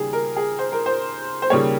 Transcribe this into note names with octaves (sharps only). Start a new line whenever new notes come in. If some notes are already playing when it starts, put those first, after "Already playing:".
Already playing: D#2 C#3 G3 G#4
A#4
G#4
C5
A#4
C5
C5
D#2 C#3 G3 A#3 C#5